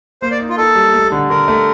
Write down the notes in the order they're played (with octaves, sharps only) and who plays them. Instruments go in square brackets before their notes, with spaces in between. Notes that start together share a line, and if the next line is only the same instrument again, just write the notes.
[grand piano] A#3 [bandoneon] C5
[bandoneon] D5
[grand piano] D#4
[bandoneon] F4
[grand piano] D#4 [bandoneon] A4
[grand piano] G3
A3
D3
[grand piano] D3 [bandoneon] A#4
[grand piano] A3